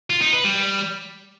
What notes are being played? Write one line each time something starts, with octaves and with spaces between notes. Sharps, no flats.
F4
D#4
B4
G3